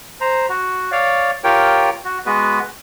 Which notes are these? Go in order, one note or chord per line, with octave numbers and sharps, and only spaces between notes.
C5 A#5
F#4
C#5 D5 F5
F4 G4 A#4 C#5 G5
F#4
G#3 B3 F#4 B4